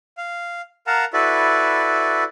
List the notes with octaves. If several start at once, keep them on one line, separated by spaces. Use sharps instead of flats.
F5
A#4 F5 F#5 A5 A#5
E4 F#4 A4 B4 D5 E5